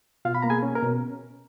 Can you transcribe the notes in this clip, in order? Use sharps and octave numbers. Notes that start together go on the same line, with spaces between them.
B2 F4 F5
B5
A#3 A#5
G#4 G#5
C#4
A#4 A#5
B2